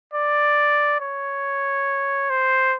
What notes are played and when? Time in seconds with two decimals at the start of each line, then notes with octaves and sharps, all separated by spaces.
0.14 D5
1.00 C#5
2.30 C5